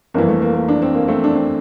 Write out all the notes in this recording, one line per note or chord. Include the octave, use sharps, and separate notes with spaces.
G1 F2 E3 A#3
A3
A#3
A#3
D4
C4
A#3
A3 C4
D4
C4